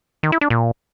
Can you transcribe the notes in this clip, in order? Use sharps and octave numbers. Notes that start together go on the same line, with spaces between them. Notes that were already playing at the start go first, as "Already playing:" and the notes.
D#3
E4
D4
A#2